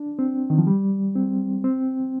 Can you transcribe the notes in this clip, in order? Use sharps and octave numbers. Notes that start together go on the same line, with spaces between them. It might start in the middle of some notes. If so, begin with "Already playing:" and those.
Already playing: D4
C4
D#3
F3
G3
C4
C4